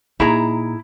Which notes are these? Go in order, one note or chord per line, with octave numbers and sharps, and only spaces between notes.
A#2 D#4 E4 G#4 A#5